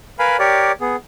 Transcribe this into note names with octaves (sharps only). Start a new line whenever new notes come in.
A#4 B4 F5 G#5 B5
G4 A#4 C#5 D5
B3 G#4